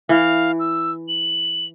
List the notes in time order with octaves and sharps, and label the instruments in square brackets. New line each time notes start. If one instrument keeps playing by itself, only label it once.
[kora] E3 [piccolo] F5
[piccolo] E6
F#7